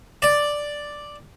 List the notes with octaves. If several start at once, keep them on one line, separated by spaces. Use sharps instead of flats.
D5